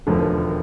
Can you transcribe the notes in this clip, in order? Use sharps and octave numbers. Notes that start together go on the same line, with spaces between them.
E1 D#2 D3 F3 A#3